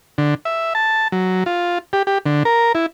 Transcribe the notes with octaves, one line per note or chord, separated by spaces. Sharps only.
D3
E5
A5
F#3
F4
G4
G4
D3
A#4
E4